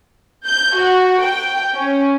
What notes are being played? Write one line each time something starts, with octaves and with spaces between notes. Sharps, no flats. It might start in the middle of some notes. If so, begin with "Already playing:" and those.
G6
F#4
G5
C#4